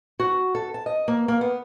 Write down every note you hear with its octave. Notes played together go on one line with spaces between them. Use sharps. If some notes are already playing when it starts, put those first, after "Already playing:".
F#4
A4
A5
D#5
A#3
A#3
B3